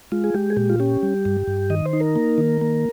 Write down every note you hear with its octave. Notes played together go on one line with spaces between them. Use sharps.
G#3 F4
G#4
G#3 G4
G#4
A#2 G4
F4
C#4 G4
G3
G2
G2
D#3 D#5
C5
D#4
A#4
A#3
D#3
A#3